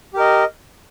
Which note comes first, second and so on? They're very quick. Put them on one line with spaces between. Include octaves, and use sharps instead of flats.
G4 A#4 D#5